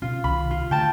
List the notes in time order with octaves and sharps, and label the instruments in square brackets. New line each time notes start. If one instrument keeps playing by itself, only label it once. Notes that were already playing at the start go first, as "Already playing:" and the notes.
[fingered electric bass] B2 C#4 [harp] F4
[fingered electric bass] C2 D#3 [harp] B5
[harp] F4
[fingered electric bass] D3 A3 [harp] G5 A5